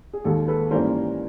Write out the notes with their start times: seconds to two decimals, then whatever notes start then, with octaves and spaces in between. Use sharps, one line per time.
0.13 G#4
0.24 D#2 D#3 G#3 G4 A4
0.48 A4 B4
0.71 G#2 E3 G3 A#3 C#4 A#4 C5